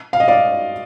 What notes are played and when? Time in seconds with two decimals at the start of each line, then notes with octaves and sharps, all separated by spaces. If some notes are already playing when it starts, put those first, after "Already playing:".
0.13 F5
0.20 D#5
0.28 D5 F5